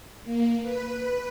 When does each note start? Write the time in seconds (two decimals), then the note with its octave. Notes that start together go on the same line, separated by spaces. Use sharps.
0.24 A#3
0.62 B4